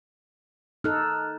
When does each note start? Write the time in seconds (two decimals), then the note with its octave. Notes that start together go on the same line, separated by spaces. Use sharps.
0.84 D#4 A4 F6 F#6